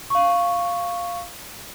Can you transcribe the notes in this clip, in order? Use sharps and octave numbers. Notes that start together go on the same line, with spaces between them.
F5 C#6